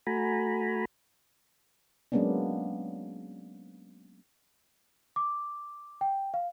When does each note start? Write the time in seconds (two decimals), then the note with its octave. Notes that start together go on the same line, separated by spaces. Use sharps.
0.07 A3 F#4 G#5 A#5 B5
2.12 F#3 G#3 A#3 B3 C#4 D4
5.16 D6
6.01 G5
6.34 F5